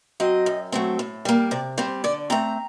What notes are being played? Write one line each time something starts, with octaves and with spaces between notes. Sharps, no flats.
F#3 C4 D#5
F#2
F#3 A3 C4
A2
G3 A#3
C3 D5
G3 C4 C5
D3 D5
A3 C4 A#5